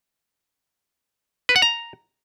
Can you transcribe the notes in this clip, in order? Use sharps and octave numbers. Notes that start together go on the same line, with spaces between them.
B4
F#5
A#5